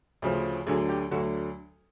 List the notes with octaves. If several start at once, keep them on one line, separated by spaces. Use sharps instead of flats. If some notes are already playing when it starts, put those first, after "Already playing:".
D2 C#3 F3
D2 D3 F#3 G#4
G4
D2 D3 F#3 F#4